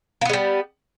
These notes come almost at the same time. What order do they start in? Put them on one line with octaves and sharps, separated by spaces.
A#3 B3 G#3 G3